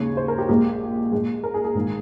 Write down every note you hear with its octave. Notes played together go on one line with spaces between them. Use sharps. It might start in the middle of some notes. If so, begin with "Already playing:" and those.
Already playing: D#2 C#3 G#3 C#5
C5
A#4
G4
A#1 A#2 G#3 G4
A#1 A#2 G#3
A#4
G#4
G#4
A#1 G#2 D#3 G#3